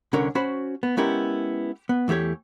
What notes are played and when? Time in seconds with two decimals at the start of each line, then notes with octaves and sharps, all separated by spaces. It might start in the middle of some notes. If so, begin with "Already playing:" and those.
0.13 C2 D3 C#4 A#4 C#5
0.35 C#4 F#4 C5 B5
0.83 B3
0.97 G#3 B3 C#4 E4 G4 A#4
1.89 B3
2.08 E2 E3 A3 G4 C#5